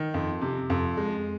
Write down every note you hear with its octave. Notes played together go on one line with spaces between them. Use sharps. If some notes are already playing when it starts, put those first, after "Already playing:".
Already playing: D#3
F2
C3
F2
G#3